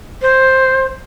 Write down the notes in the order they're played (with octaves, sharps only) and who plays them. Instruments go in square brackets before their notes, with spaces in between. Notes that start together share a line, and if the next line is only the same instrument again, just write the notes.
[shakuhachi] C5